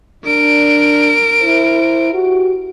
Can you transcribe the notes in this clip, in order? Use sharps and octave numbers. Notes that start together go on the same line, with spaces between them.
D4 A#4 D7
E4 C5
F#4 G4